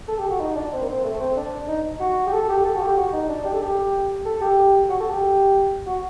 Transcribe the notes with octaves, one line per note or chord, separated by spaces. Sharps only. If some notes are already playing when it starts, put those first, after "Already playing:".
A4
G4
F#4
D#4
D4
C4
A#3
C4
A3
C4
D4
D#4
F#4
G4
A4
G4
A4
F#4
G4
F#4
D#4
D4
G4
A4
G4
A4
G4
F#4
A4
G4
F#4